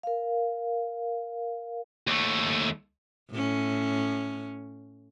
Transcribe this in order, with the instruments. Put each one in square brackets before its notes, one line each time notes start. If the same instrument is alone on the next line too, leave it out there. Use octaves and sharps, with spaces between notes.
[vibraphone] A#4 F5
[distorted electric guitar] D#2 A3
[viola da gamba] A2 C#4